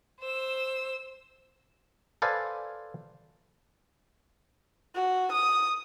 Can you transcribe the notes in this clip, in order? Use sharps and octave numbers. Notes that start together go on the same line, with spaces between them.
C5 E6
A4 B4 C5 D5 F5 G#5
F#4
D#6